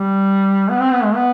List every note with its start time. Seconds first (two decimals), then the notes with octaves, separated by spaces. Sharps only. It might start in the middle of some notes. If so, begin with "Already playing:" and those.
Already playing: G3
0.69 B3
0.80 C4
0.92 B3
1.04 G#3
1.15 B3